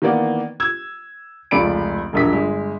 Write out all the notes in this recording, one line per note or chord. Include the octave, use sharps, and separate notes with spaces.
D#3 E3 A#3 B3 D5
E6 G#6
F1 C#2 D5 B5 D7
E1 A#1 B6
G1 G#3